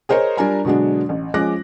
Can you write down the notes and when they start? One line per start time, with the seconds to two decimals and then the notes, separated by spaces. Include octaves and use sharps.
0.09 G#4 A#4 C5 C#5 D#5
0.37 G3 D4 F4 A#4 G#5 A#5
0.65 B2 D3 F#3 G#3 D4
1.09 A1
1.34 F3 G#3 C#4 D6 F#6 A#6